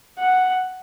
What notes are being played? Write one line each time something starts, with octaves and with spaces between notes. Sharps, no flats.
F#5